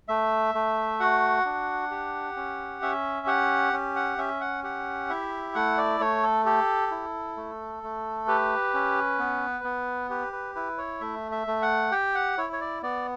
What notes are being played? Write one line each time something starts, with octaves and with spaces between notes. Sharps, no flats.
A3 E5
A3
F#4 F#5
D4
G4
C#4
C#4 E5
G4 F#5
C#4
F#5
C#4 E5
F#5
G4 F#5
E4 E5
A3 F#5
D5
A3 C#5
A4
G4 A4
E4
A3
A3
G4 B4
C#4
B3
B3
G4 B4
B4
E4 B4
C#5
A3 E5
E5
A3
F#5
G4 G5
F#5
E4 C#5
C#5
D5
B3 D5